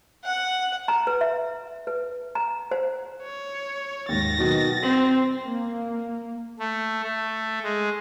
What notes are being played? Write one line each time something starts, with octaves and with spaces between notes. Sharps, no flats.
F#5
A#5
B4
E5
B4
A#5
C5
C#5
D#2 G#2 A6 A#6
B2 D#3 F#3
C4 F#7
A#3
A3
A3
G#3